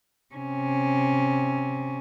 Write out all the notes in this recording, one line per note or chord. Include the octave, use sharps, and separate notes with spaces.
C3 C#4